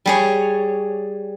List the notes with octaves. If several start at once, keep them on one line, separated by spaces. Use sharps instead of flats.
G3 G#4 C#5